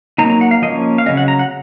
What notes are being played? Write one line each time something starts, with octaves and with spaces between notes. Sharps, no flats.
F#3 A#3 D#4 A#5
A#5
F#5
F5
F3 A#3 C#4 D#5
F5
C#3 F#3 C#4 D#5
F#5
A#5
F#5